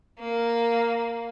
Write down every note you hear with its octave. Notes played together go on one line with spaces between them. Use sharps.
A#3